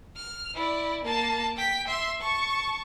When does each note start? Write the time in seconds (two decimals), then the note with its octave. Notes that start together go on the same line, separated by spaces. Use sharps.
0.17 F6
0.55 E4 D5
1.05 A#3 A5
1.57 G5 B6
1.88 E5 C6
2.21 A5 C#6